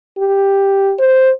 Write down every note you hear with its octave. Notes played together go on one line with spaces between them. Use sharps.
G4
C5